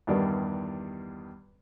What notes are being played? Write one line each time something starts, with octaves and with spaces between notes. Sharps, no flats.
E2 G2 D#3 G3 D5